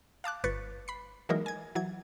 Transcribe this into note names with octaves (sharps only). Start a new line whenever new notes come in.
F5 A5 D6 F#6
G1 B4 C#6 F#6 A6 C#7
B5 C7
E3 F#3 G#3 A#3 D#4 A#4
G#5 G#6
E3 F#3 G#6